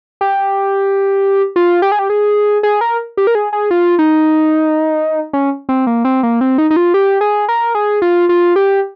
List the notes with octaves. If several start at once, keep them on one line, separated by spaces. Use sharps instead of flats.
G4
F4
G4
G#4
G4
G#4
G#4
A#4
G4
A#4
G#4
G#4
F4
D#4
C#4
C4
A#3
C4
A#3
C4
D#4
D#4
F4
G4
G#4
A#4
G#4
F4
F4
G4